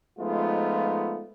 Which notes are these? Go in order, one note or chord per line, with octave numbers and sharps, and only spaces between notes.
F3 G#3 A3 B3 D#4 F4